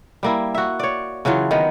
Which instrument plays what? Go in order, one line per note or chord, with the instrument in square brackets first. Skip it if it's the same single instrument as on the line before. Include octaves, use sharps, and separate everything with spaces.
[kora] G3 A#3 E4
F#4 E5
C#5 D5
C#3 E3 F#3 F4
D#3 B3